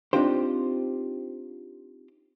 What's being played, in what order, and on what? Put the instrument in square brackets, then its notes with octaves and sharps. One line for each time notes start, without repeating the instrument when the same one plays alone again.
[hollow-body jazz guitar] C4 D4 D#4 F4 G4 C5